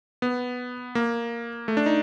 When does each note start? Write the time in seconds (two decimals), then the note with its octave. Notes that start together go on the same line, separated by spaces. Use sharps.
0.22 B3
0.95 A#3
1.68 A3
1.77 D4
1.86 D#4